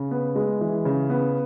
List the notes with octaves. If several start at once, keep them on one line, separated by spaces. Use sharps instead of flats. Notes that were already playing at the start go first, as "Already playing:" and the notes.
Already playing: C#3
B3
G#3
E3
C#3
B3